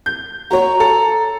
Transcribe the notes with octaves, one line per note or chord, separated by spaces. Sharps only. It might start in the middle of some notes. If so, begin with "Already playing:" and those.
G6
F#4 C#5 A#5
A4